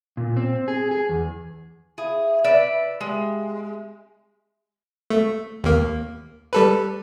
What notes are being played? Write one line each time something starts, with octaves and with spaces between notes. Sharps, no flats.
A#2
C4
G#4
G#4
E2
E4 G#4 F5
B4 D5 E5
G#3 G4 E5 F5
A3
D#2 A#3
G3 A4 B4